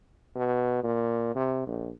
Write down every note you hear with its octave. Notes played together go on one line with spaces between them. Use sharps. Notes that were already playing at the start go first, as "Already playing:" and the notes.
B2
A#2
C3
A#1